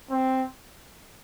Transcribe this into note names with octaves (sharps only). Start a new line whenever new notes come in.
C4